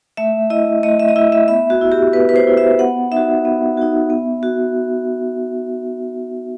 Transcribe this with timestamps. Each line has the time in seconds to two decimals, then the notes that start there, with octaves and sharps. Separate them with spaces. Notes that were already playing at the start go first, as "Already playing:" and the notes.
0.17 A3 E5
0.50 E4 D#5
0.83 A3 D#5
0.99 E5
1.08 D#5
1.16 E4 E5
1.32 E5
1.48 B3 E5
1.70 F#4
1.81 E4
1.92 G4
2.13 B3 B4
2.29 B4
2.36 C5
2.47 E4
2.57 E5
2.79 B3 F#5
3.12 D#4 F#4 E5
3.45 B3
3.77 D#4 F#4
4.10 B3
4.43 F#4